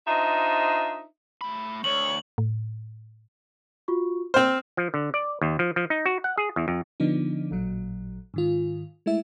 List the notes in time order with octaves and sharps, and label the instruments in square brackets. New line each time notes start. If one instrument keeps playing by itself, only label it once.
[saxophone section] D4 D#4 F4 C5 D#5 E5
[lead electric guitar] A3 B5
[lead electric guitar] D2 [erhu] C#5 [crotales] F#7
[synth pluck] A2
[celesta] F4 F#4 C#6
[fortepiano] C4 C5 [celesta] F6
[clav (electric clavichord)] F3
D3
D5
D#2
F3
F3
D#4
F#4
F#5
G#4
E2
F2
[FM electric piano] D3 F3 B3 D4 D#4
A1 A#2 F#3
G#2 D#3 F4
G#3 A3 E4 E5